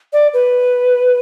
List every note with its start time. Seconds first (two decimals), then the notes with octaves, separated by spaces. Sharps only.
0.13 D5
0.33 B4